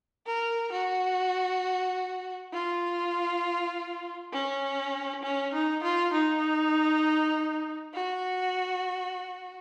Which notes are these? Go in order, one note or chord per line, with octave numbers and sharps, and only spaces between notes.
A#4
F#4
F4
C#4
C#4
D#4
F4
D#4
F#4